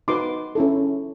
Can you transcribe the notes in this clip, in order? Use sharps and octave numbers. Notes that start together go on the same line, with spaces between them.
D#4 F#4 B4 C6 D6
C#4 E4 A4